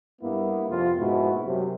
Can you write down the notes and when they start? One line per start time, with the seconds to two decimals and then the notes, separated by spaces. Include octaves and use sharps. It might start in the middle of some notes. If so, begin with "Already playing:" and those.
0.22 G2 A#3 B3 E4
0.68 F2 C3 B3 F4
0.97 G#2 B2 A#3 E4 F#4
1.45 F#2 C3